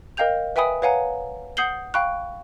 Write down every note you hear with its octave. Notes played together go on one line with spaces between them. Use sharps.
A#4 D#5 F5 G5 G6 F7
B4 E5 G5 G#5 B5 D#6
B4 C#5 F5 F#5 G#5 A#5
F#5 D#6 G6 C7 F#7 G7
F5 G5 B5 C#6 F#6